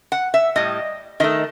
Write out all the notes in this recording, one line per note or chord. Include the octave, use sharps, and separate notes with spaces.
F#5
E5
A2 G3 D#5
D#3 A3 D#5